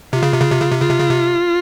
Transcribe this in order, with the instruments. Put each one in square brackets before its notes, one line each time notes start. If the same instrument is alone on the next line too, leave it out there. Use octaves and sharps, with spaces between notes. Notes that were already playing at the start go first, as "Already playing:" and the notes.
[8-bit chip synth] C3 [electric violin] F4
[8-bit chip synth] C#3
C3
C#3
C3
C#3
C3
[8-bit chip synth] C#3 [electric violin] F4
[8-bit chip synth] C3
C#3
C3